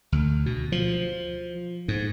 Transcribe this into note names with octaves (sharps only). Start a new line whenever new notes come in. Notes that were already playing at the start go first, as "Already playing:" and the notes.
D2
B2
F3
G#2